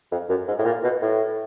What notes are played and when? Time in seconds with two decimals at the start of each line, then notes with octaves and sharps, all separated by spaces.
0.12 F2
0.29 F#2
0.48 G#2
0.59 A2
0.65 A#2
0.83 B2
1.02 A2